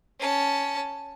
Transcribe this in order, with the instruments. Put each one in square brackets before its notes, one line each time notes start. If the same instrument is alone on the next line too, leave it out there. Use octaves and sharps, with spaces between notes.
[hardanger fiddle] C#4 A5